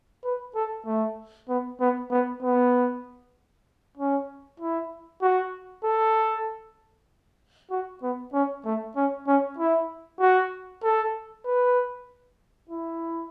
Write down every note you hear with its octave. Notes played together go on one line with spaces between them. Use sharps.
B4
A4
A3
B3
B3
B3
B3
C#4
E4
F#4
A4
F#4
B3
C#4
A3
C#4
C#4
E4
F#4
A4
B4
E4